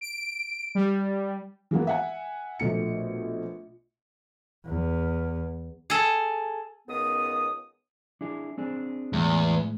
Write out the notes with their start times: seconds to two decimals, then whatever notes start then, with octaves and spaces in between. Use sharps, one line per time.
0.01 D7
0.75 G3
1.71 E3 G#3 A#3 B3
1.87 E5 F#5 G#5
2.60 A#1 B2 A3 C#7
4.66 E2
5.90 G#4 A4
6.88 C#2 D#3 B3 D#6
8.21 D4 E4 G#4
8.58 C4 D4 G#4
9.13 E2 A2 G#3